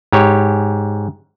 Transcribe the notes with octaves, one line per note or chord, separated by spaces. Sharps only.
G#2 G4 C#5